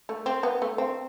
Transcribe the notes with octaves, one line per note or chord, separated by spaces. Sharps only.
A3
C4
B3
A3
C4